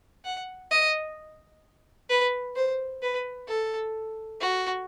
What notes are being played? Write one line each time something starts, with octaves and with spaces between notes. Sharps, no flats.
F#5
D#5
B4
C5
B4
A4
F#4